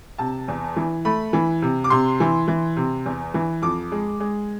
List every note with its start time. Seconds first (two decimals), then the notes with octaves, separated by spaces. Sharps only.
0.18 C3 A5
0.48 E2
0.76 E3
1.05 A3 B5
1.33 E3
1.62 C3
1.84 D6
1.90 C3 C6
2.20 E3
2.48 E3
2.76 C3
3.06 E2
3.34 E3
3.62 F2 D6
3.92 G#3
4.20 G#3